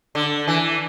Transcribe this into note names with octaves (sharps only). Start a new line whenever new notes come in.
D3
E3